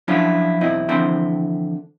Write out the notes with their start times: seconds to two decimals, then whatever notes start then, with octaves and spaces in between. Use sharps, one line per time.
0.08 F3 F#3 C#4 D4 E4 F4
0.61 B1 E2 C4 E4 D#5
0.89 D3 E3 F3 C4 E4 C5